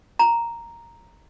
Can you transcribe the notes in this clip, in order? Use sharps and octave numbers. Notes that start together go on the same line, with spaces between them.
A#5